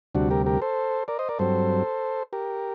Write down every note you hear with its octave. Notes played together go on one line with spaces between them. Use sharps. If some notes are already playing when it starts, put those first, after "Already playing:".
D2 C3 G3 D4 F#4
G4 A#4
G4 A#4
A4 C5
A#4 D5
C5 D#5
A#4 D5
G2 F#3 C4 A4 C5
G4 A#4